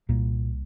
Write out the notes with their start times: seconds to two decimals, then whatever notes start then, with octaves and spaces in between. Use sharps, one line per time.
0.09 C2 A#2 A#3